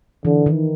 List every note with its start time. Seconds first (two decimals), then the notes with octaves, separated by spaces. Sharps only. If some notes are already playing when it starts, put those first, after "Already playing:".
0.25 D3 E3
0.46 D#3